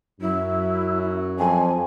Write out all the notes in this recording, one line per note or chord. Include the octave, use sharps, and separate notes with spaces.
F#2 F#3 E4
F2 G#5